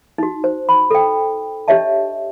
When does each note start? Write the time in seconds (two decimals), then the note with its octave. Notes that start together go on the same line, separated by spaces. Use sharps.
0.18 D#4 F#4
0.44 C5
0.69 B5
0.91 A4 G5
1.68 D4 G4 C#5 D#5 E5 A5